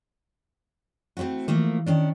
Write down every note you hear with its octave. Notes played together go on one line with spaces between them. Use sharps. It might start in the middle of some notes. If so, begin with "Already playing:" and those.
A3 C4 C#4 E4 F#4
E3 F3 A3 A#3
D#3 C#4 D4